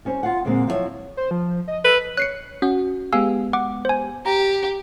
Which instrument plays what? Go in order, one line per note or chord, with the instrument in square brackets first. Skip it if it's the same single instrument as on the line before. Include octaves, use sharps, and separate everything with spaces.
[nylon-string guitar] G3 C#4 C5
F4 F5 F#5
A#2 D3 G#3 A#3 C4
F3 F#3 E4 A4 C#5
[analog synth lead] C5
F3
D#5
[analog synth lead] A4 [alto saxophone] B4
[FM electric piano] C#5 [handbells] F#6 C7 C#7
[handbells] C#4 [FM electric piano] F#4
[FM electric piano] G#3 B3 G4 [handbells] F5 G#5 E6
[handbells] F#5 D6
C5 G#5
[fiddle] G4 [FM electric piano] A#5